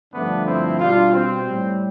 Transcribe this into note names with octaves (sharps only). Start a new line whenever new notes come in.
G2 D3 F3 A3 B3 D4
C4 E4
B2 G3 D4 F4
C4
A2 G3